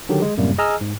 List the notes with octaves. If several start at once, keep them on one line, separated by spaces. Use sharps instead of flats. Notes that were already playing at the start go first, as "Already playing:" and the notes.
D3 D#3 F#3 G4
G#3
F#2 A2 C3 G3 A#3
G#4 D#5 G#5 A#5 E6 F6
G#2